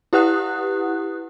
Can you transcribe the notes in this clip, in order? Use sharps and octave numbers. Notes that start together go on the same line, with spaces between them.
E4 G4 B4 F#5 D#6 F#6